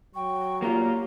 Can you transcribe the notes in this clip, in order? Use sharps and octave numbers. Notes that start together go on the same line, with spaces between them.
F#3 G5 C#6
A#3 F4 G4 A#5